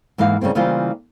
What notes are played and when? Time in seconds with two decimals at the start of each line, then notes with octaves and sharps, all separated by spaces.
0.18 G#2 E3 A#3 F5
0.41 C#3 G3 A#3 C4
0.55 C#3 E3 G3 A#3 F4 C5